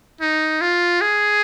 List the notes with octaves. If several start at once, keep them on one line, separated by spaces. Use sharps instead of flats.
D#4
F4
G#4